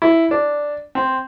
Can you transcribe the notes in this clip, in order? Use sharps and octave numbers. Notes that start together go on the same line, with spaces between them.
E4
D4
C4